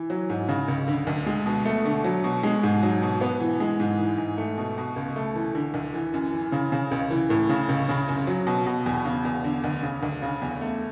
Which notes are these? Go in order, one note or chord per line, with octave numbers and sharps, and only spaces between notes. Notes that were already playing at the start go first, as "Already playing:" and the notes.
Already playing: E3
F#3
G#2
C#3
C#2
D3
D2
G#3
B2
A3
D3
F#3
B2
G#3
G#2
F#3
B2
B3
E3
G#3
G#2
E3
G#2
A3
B2
B2
C#2
A3
E3
D3
D2
E3
F#2
E3
C#3
C#3
C#2
E3
A2
C#3
C#2
C#3
F#2
F#3
B2
B2
E2
C#3
E2
D3
D2
C#3
D2
C#3
E2
A3